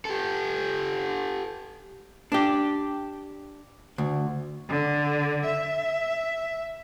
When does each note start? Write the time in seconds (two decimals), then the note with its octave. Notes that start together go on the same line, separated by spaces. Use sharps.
0.05 G4 A4
2.32 D4 G4
3.98 D2
4.69 D3
5.45 E5